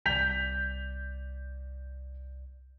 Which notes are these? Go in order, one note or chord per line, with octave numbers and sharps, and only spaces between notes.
C2 D5 G6 B6 F7